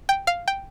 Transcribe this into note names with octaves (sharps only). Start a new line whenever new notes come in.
G5
F5
G5